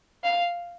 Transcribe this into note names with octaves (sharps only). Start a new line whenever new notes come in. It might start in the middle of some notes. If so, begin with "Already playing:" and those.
F5